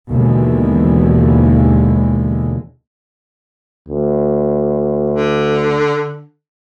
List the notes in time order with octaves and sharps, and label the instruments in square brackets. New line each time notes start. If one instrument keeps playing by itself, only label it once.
[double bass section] D#2 B2 D3 E3 G#3
[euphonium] D2
[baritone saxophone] D3